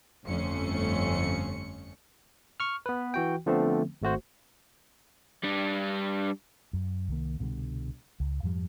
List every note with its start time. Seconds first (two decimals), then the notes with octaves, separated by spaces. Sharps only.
0.24 G1 F2 A3 C#4 C#7
2.60 C#6 F6
2.86 B3 B4
3.14 E3 F#4 G5
3.46 D3 F3 A3 B3 C4
4.02 G#1 A3 F#4 C5
5.43 G3 D4
6.73 F#2
7.08 C2 D#3 A#3
7.39 C2 B2 D3 G3
8.20 C#2
8.43 F2 G#2 F3 G3